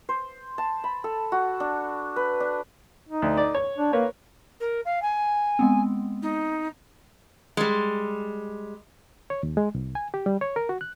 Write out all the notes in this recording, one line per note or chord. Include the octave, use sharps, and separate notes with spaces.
C5
A5
B5
A4
F#4
D4
B4
D4
D#4
D2
D5
C#5
D4
A#3 A#4 B4 C#5
A#4
F5
G#5
G#3 B3 C4
D#4
G3 G#3
C#5
D#2
G#3
C2
G#5
G4
G3
C#5
A#4
F#4
F#6